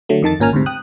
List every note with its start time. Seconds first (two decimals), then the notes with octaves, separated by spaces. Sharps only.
0.09 D3 F#3 A3
0.22 F2 D#3 A5 A6
0.40 G#1 A#2 C#4 A#4 G#5 F6
0.53 D2 G#2 C3
0.66 G5 D#6 F#6